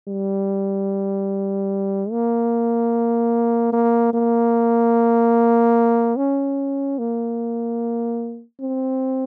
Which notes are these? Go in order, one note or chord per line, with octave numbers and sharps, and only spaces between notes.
G3
A#3
A#3
A#3
C#4
A#3
C4